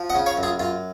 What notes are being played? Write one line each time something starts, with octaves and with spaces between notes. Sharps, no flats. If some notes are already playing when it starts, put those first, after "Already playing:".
Already playing: F3
D#5 F#5
C#3
C#5 F5
F#2
F4 G#4
F#2 F4